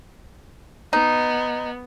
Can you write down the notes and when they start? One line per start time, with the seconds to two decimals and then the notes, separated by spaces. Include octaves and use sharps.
0.93 B3 D#4